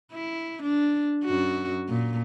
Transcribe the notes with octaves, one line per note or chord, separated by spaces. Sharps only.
E4
D4
F#2 F#4
A#2